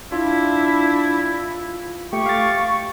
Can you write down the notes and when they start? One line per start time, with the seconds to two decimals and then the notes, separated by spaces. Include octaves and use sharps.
0.12 D4 E4 F4
2.13 A3 G4 C#6
2.26 F5 A6